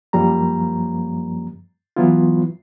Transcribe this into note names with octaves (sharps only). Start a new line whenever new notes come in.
F#2 F3 G3 A#3 A#5
E3 F#3 B3 E4 F4